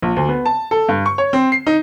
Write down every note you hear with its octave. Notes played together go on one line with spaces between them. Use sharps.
A#1
D2
B3
A5
A4
G2
C#6
C#5
C4
C7
D#4